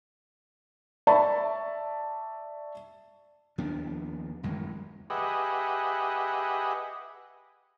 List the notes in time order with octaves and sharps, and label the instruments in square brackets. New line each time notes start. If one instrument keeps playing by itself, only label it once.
[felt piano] D5 E5 A5 B5 C#6
[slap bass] D#2 F3 B3 D4
A1 F#2 D#3 G#3
[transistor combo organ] G4 G#4 B4 D#5 E5 F#5